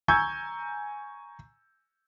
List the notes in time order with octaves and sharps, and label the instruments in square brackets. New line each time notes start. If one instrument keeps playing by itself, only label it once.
[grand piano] G#5 A#5 C#6 E6 G6 G#6